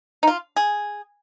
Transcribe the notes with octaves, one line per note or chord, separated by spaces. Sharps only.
D#4
F4
G#4